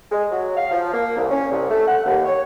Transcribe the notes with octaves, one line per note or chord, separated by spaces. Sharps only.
G#3
F#3
F5
F3
A#3
C2
C#4
C2
A3
F#5
D#2
C#5